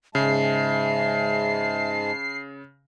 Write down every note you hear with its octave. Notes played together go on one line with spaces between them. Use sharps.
G#2 C#3 G#3 E5 A5 C7